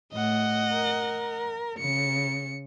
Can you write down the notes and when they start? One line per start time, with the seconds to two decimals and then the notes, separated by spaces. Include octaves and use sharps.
0.13 A2 D#5 F#5
0.74 A#4
1.80 C#3 C#7